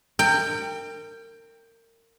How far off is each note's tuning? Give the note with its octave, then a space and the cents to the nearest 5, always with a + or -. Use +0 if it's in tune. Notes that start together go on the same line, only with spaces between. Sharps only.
A#4 -30 G5 +15